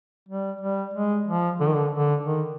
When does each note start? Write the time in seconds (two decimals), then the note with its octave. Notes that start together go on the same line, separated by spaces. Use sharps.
0.29 G3
0.61 G3
0.94 G#3
1.27 F3
1.60 D3
1.67 D#3
1.74 D3
1.92 D3
2.26 D#3